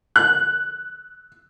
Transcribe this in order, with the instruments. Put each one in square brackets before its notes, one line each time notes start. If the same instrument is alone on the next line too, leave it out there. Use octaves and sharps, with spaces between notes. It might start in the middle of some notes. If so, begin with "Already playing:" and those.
[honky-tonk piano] F#6